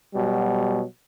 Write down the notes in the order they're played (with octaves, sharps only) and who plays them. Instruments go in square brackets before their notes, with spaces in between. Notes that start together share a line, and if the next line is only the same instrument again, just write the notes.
[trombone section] B2 F#3 G3